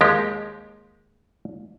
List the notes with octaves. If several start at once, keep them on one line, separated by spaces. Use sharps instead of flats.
D#2 F3 G#3 G4